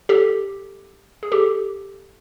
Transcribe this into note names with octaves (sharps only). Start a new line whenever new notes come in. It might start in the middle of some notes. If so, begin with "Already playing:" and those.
G4 A4
G#4
G4 A4